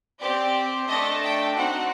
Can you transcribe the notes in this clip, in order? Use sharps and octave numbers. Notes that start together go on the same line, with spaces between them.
C4 G4 D5
A3 D4 A4 D#5
G5
C4 D#4 F#4 F#5